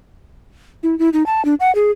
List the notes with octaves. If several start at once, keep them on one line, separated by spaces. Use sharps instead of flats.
E4
E4
D#4
A5
D4
F#5
G#4